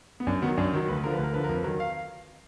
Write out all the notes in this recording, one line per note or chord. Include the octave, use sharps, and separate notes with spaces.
B3
F#2 D4
D#3 F#3 B3
F#2 D4
D#3 F#3
D2 B4
D3 F3 A#4
B4
D2 A#4
D3 F3 B4
A#4
F2 B4
D#3 F#3 A#4
F5